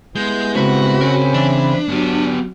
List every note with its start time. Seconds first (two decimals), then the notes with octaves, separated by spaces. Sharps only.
0.15 G3 G#3 B3 E4 G6
0.56 C#3 G#3 C4 F#4 A#4 B5
1.01 C#4 A#4 C#5
1.34 E3 D4
1.89 F#3 B3 G4